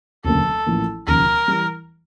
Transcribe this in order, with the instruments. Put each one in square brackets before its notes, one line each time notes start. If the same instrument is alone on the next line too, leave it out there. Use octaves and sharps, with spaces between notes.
[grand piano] E1 D2 C#3 F#3 A#3 [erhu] A4
[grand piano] A1 A2 F3 A#3
[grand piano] E1 D#2 C#3 F3 [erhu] A#4
[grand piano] E3 G3